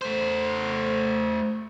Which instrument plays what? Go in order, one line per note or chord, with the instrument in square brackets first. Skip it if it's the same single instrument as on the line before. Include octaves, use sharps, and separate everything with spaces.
[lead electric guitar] A3 C5